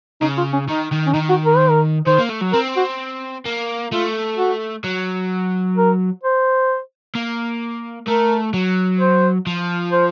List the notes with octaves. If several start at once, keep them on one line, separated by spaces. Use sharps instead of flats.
C#3 D#4
F4
C#4
D#3 D#4
D#3
C#4
D#3 D#4
F#4
A#4
C5
A#4
D#3 C5
A#3
A3
F#3
C4 A#4
F#4
A#3
A3 F4
F#4
F#3
A#4
C5
A#3
A3 A#4
F#3
C5
F3
C5